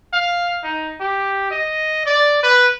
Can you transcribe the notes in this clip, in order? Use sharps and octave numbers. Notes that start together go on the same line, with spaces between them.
F5
D#4
G4
D#5
D5
B4